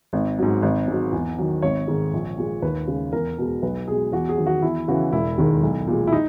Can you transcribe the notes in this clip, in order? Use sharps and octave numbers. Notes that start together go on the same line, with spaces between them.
G#1
G#2 F#3
G#1
G#2 F#3
E2
D#3 F#3
G#1 C#5
G#2 D#3 G#3
A#1
A#2 G#3
D#2 B4
C#3 G#3
E2 A#4
B2 G#3
B1 B4
B2 G#3 G#4
E2 F#4
G#4
D#3 F#3
F#4
E2 E4
C#3 E3 F#4
E1 E4
D#2 D#3 G#3
B1
A#2 G#3
E4
D#4